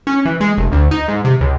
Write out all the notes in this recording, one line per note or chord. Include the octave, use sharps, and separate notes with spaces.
C#4
E3
G#3
F1
D2
D#4
G#2
C3
C#2